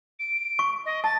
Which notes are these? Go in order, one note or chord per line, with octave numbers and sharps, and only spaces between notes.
D7
C#6
D#5
A5 A6